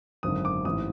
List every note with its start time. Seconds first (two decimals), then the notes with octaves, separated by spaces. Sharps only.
0.23 G#1 F#2 D3 D#6
0.45 D6
0.65 A1 G#2 E3 D#6